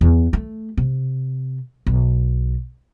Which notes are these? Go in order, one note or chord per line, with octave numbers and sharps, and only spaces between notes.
E2
A3
C3
B1